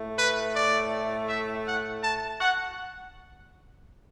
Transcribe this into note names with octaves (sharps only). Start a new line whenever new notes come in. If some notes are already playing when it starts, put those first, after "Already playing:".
Already playing: A2 A3
B4
D5
E5
F#5
A5
F#5